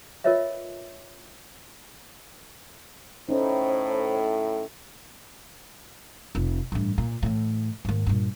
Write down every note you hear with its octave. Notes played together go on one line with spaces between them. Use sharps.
F4 A#4 B4 C#5 D#5 E5
A2 C#4 D#4 C5
F1
A1 G2
A#2
A2 E3
D#2 G#2
G2 A#2